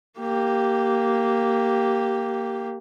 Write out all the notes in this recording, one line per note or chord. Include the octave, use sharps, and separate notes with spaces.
A#3 G4